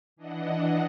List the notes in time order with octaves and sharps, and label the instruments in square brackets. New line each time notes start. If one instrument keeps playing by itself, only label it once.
[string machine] E3 D4 D#5 F#5